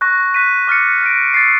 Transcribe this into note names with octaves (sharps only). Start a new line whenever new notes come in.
C#6 F#6 A#6
F#6 B6 D#7
D6 F6 A6 C#7
F6 A#6 D7
E6 A6 C7